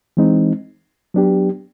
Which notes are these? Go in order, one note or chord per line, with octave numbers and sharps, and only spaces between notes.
E3 G#3 C4 D#4
F#3 B3 D4 G4